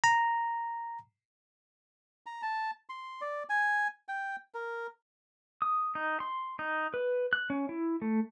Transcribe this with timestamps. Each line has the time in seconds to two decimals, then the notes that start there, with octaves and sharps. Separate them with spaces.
0.04 A#5
2.26 A#5
2.42 A5
2.89 C6
3.21 D5
3.49 G#5
4.08 G5
4.54 A#4
5.62 D#6
5.95 D#4
6.20 C6
6.59 D#4
6.94 B4
7.33 F#6
7.50 C#4
7.69 E4
8.02 A3